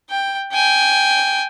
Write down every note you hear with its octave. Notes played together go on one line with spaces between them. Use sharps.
G5
G5 G#5